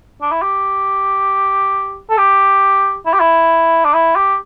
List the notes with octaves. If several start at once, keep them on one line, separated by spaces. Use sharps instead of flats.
D4
E4
G4
A4
G4
E4
G4
E4
D4
E4
G4